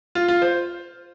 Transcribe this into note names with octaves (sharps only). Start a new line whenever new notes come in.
F4
F4
C5